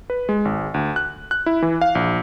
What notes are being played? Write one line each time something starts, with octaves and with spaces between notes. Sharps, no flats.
B4
G#3
G#1
D2
F#6
F#6
E4
E3
F5
A#1